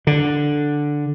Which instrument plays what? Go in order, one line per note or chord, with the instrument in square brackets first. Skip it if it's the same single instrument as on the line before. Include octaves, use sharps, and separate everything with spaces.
[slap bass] D3